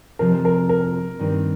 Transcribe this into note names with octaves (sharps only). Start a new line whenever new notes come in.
F2 C3 F3 C4 A#4
A#4
A#4
G2 D#3 C4